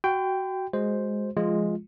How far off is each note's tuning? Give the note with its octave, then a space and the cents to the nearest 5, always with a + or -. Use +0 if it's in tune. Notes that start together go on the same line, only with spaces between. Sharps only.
F#4 +15 G5 +0 C6 -45
G#3 +0 F#4 +0 C5 +0
F3 -20 G#3 +0 F4 +0